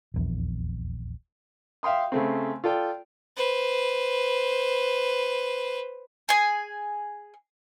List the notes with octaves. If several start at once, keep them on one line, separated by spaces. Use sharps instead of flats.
D#1 A#1 E2
E5 F5 G5 C6 D#6
C#3 A3 C4
F4 A4 D5 G5
B4 C5
G#4 G#5